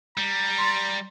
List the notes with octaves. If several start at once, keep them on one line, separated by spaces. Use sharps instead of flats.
G3 A#5
C6 A6